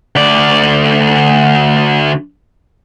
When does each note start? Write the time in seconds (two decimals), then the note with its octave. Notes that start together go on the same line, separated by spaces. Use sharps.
0.16 D2 D5